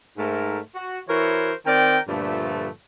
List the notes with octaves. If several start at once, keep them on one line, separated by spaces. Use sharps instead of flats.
G#2 A3 A#4
F#4
E3 E4 F#4 A#4 C5 C#5
D#3 C4 A#4 D5 G5
G2 A#2 D3 F3 A3